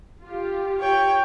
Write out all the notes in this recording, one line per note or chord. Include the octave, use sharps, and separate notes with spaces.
F4 G4
C#5 G5